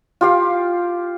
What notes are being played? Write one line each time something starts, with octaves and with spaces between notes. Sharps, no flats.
F4 G4 F5